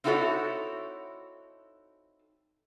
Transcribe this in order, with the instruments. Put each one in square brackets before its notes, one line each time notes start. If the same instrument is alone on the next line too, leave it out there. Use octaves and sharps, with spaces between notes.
[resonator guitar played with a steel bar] C4 D#4 E4 F#4 A4 C#5